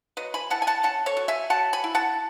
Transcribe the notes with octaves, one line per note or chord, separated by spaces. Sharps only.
F#3 B4 D#5
G#5 B5
E4 F#5 A5
G#5
F#5 A5
C#4 F#5 A5
A4 C#5
F#3
E5 G#5
F#3 F#5 A5
G#5 B5
E4
F#5 A5